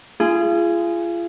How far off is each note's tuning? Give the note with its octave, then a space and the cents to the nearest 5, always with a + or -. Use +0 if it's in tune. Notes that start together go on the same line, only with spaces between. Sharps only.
F4 -35 G#4 +0